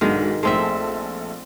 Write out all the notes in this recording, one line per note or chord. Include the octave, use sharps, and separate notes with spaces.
B1 G#2 D#3 G#3 D4
A#1 G#3 A3 C4 A4 E5